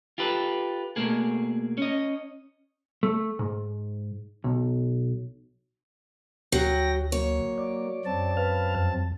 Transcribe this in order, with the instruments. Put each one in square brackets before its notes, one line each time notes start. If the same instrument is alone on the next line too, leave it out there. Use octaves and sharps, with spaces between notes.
[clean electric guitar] F4 G4 A4 B4
B2 F3 A3 A#3 G#4
C#4 D#5
A3
G#2
B1
[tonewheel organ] D2 [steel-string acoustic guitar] F#3 [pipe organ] G5 A#6
[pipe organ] F#3 A#3 [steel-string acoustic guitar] C#5
[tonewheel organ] D5
[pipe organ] F#2 C4 A5
[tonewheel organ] B4 F5 F6
F2